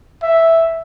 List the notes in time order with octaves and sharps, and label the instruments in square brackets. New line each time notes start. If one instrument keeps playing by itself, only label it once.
[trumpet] E5